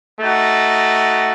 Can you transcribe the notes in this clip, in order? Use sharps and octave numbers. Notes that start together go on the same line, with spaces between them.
A3 D#4 F#4